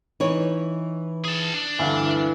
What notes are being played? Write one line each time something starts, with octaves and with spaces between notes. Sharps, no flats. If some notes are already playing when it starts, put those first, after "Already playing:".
E3 D#4 C#5
G#4 A5
D4
D2 G2 E3 F5